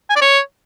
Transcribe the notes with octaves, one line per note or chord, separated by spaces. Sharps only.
G#5
D5
C#5